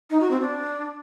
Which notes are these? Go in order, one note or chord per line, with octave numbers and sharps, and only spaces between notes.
D#4
F#4
C4
D4